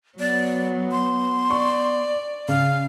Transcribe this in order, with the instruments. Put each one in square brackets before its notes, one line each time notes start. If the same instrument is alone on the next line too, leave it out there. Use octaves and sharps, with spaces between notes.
[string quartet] F#3 [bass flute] B3 [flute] D5
[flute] C6
[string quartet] D5 [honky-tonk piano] C#6
[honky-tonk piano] C#3 [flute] F5